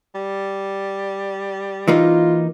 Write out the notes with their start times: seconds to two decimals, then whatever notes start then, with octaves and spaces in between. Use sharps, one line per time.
0.15 G3
1.88 E3 A#3 D#4 F4